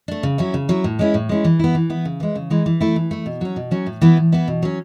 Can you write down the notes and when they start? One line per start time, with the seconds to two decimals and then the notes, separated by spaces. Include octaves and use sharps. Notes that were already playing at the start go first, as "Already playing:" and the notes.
0.08 A3 D4
0.23 C#3
0.38 F#3 C#4 E4
0.54 C#3
0.69 F#3 C#4 E4
0.84 A2
0.99 G#3 C#4 E4
1.14 A2
1.29 G#3 C#4 E4
1.45 E3
1.59 B3 E4
1.75 E3
1.90 B3 E4
2.05 C#3
2.20 E3 G#3
2.35 C#3
2.50 E3 G#3
2.66 E3
2.81 A3 E4
2.96 E3
3.11 A3 E4
3.26 B2
3.41 F#3 C#4
3.56 B2
3.71 F#3 C#4
3.86 A2
4.01 E3 B3 E4
4.17 A2
4.32 E3 B3 E4
4.48 B2
4.62 F#3 C#4